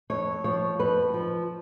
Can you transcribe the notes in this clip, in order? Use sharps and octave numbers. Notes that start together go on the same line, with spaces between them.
F2 C#5
F3 C#5
F2 B4
F3